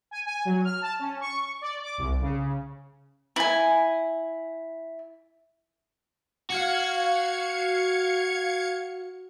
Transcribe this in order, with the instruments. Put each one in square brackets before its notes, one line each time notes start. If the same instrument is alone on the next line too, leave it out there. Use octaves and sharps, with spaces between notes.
[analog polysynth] G#5
G#5
F#3
F6
A5
C#4
C#6
D5
D6
C2
C#3
[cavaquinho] E4 G#5
[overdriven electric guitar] F#4 [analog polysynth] F5 G#6 C#7